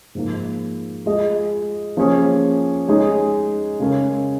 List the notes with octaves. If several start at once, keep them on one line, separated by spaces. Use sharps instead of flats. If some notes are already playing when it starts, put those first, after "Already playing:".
G#2 F3 A#3
G#3 F4 G#4 D#5
F3 A#3 C#4 G#4 C#5
G#3 D#4 G#4 C#5
C#3 G#3 C#4 A#4